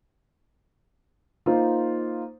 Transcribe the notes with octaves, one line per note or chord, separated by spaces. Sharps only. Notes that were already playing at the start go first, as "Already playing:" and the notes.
A#3 D#4 F4 C5